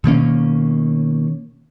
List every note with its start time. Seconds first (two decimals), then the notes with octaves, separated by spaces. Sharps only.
0.04 B2 D#3 A#3 C#4